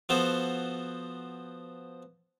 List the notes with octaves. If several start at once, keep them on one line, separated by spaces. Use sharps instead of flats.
F3 B3 F#4 A4 C5